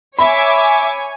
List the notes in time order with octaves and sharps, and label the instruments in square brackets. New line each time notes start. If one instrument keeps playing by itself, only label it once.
[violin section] C#5 G#5 [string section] E5 D6 [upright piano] B5